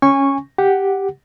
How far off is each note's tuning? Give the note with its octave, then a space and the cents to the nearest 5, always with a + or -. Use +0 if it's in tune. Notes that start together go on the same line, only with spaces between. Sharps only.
C#4 -5 G#5 -20 C#6 -5
G4 +0 F#5 +5